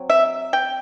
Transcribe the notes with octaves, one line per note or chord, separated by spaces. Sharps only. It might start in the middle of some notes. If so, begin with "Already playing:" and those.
Already playing: F#3 C4
E5
G5